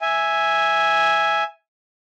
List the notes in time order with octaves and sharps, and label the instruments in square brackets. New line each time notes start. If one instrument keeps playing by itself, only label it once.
[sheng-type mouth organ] E5 G#5